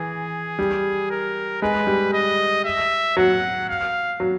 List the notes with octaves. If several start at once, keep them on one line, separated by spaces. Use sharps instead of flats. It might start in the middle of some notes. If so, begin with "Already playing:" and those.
Already playing: E3 G#4
G3
A#4
G#3 B4
G3
D#5
E5
F#3 F#5
F5
F#3